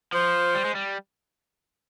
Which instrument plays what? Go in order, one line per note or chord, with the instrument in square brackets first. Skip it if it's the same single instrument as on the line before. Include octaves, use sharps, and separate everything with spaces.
[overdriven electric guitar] F3 [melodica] C5
[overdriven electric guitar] G3
G#3
G3